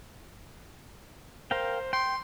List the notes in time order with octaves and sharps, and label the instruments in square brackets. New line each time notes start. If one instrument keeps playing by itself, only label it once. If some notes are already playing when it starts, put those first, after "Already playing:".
[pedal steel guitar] A#4 F5 G5 [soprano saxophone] C5
[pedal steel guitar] G5 [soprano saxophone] C6